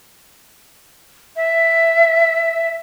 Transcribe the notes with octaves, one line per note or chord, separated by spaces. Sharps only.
E5